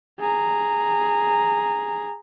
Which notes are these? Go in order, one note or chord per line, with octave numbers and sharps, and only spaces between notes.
G#4 A#5